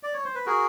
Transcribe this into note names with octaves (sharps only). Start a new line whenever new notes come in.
D5
C#5
C5
B4
F#4 G#4 A#4